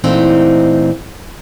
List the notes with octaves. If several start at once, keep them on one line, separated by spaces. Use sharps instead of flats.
A#2 E3 A3 C4 D#4